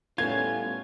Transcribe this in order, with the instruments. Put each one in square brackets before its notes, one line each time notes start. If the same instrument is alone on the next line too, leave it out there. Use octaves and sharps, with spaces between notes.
[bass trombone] A2 [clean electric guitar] G3 B3 F4 [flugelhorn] C#4 [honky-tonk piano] G#6